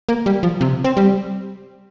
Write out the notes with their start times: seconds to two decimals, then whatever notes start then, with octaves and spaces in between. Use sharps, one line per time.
0.09 A#3
0.26 G3
0.43 F3
0.61 C3
0.84 C4
0.97 G3